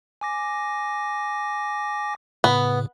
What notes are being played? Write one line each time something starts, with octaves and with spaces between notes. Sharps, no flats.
G#5 D6 A#6
A2 C#3 B3